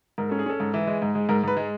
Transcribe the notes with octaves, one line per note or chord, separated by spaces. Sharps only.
G#2 A#4
C#4 A4
G#4
C#4 A4
G#2
E3
G#3
G#2
G#3
G#2 A#4
G#2 B4
G#3